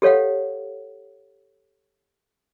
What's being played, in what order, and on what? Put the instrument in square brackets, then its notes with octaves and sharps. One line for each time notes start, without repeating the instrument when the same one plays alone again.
[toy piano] G4 A4 C#5 F5 F#5